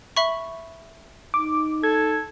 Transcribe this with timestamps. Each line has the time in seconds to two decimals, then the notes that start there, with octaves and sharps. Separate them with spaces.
0.17 E5 B5 C#6
1.34 D#4 D6
1.83 A4 G#6